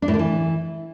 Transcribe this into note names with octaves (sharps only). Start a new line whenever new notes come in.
D4
A2
D3
E3